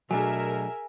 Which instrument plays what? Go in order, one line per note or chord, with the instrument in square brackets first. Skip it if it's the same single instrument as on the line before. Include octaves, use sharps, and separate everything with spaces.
[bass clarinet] B2 [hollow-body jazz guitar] F#3 A3 D4 [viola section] G#4 A#4 E5 [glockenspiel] G#5